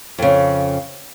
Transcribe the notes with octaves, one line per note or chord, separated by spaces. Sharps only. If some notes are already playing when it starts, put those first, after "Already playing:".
F2 C#3